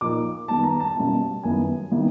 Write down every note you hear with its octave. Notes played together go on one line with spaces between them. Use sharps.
A#2 F3 A#3 D#4 D6
D#3 G3 B3 A5
A#5
A5
B2 G3 A#3 C#4 E4
F#2 D#3 G3 B3 E4 G#5
C3 D#3 G3 B3 E4